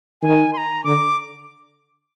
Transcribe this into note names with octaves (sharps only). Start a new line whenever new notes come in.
D#3 G#5
C6
A#5
D3 D6